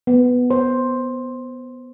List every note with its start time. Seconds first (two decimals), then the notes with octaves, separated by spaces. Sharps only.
0.07 B3
0.51 C5